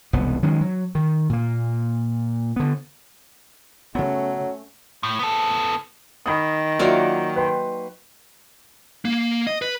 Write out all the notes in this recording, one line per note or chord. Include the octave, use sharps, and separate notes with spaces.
E1 C2 B3
D#3 F#3 G#3 C#4
F#3
D#3
A#2 A#3
D3 B3
C#3 F#3 A3 B3 C#4
A2
B3 A4
D#3 B5 D#6
F#3 A#3 F4 D5 E5
B4 G5 C6
A#3
D#5
B4